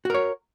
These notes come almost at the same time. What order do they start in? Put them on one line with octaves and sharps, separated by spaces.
F#4 A#4 C#5